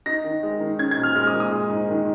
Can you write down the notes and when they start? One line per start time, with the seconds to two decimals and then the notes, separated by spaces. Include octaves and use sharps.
0.06 D#4 A#6
0.24 D#3
0.43 G#3
0.60 D#3
0.79 C#4 G#6
0.91 G#6
0.98 A#2
1.03 F6
1.15 G#3 F6
1.27 D#6
1.33 A#2
1.40 D#6
1.52 G#3
1.69 G#2
1.89 D#3